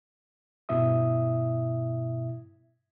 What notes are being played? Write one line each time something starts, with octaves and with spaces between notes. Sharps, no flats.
G2 B2 E4 E5 D#6